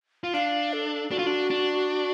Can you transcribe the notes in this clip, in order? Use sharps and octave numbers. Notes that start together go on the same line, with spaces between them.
F4
D4 F5
A4
D4 F#4
F4
D4
D4